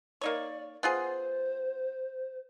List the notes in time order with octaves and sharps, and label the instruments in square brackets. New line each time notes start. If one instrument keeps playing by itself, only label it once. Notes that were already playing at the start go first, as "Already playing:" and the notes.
[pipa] A#3 D#4 C#5 [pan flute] D5
[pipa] B3 F4 G#4 [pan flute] C5